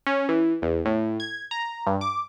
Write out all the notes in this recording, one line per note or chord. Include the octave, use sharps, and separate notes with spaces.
C#4
E3
E2
A2
G#6
A#5
G2
D6